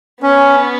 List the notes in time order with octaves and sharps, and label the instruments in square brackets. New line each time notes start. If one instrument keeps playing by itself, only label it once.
[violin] B3 [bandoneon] C#4